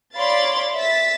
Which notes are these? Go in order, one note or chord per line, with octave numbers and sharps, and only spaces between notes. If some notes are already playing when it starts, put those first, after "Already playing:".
C#5 D5 F5 B5 C6 A6
E5 A6 B6